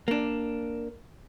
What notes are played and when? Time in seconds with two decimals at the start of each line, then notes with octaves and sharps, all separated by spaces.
0.08 A#3 D4